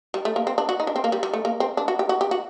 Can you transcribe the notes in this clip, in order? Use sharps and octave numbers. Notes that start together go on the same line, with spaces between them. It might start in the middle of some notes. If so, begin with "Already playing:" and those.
G3
A3
A#3
C4
D4
F#4
D#4
D4
C4
A#3
G3
G3
A3
A#3
C4
D4
F#4
G4
F#4
G4
F#4